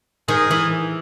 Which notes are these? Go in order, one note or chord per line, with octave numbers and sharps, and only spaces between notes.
D#3 G#4
E3